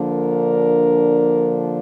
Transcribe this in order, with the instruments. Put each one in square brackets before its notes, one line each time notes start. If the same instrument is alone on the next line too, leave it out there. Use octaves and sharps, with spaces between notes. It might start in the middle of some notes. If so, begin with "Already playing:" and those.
Already playing: [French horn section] D3 F3 A#3 D4
A#4